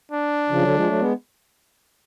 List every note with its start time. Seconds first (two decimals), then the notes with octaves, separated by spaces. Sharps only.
0.12 D4
0.50 C#3 F3
0.62 D3 F#3
0.74 F3 G#3
0.87 F#3 A3
0.99 G#3 B3